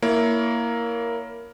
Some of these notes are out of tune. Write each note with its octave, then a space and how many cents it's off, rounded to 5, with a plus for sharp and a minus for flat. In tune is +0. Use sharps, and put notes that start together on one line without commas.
A#3 +0 E4 +0 C#5 +25